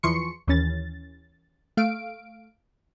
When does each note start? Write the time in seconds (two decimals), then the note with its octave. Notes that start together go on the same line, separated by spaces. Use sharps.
0.03 E2 E3 F3 C6 C#6 C#7
0.47 D#2 E3 C#4 A6
1.77 A3 F5 D7